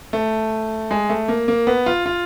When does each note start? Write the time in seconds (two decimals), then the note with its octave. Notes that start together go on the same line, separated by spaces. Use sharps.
0.13 A3
0.91 G#3
1.10 A3
1.28 A#3
1.48 A#3
1.67 B3
1.86 F4
2.06 F4